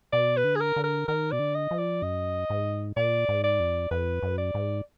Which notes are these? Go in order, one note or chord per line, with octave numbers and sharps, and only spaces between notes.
B2 D5
B4
D3
G#4
A#4
D3
A#4
D#3 A#4
B2 D5
D3
D#5
F3
D5
F#2 D#5
G#2
A#2 D5
G#2
D5
F2
F2 B4
F#2
D5
G#2